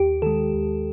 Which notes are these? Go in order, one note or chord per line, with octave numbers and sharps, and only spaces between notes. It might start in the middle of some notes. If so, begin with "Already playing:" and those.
Already playing: D#2 G4
D#3 G#3 A4
D#2